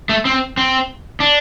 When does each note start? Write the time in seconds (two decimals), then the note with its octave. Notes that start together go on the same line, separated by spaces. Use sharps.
0.09 A3
0.25 C4
0.57 C4
1.20 D4